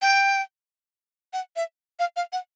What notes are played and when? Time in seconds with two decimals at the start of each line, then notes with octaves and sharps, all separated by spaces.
0.02 G5
1.33 F#5
1.56 E5
1.99 F5
2.16 F5
2.33 F#5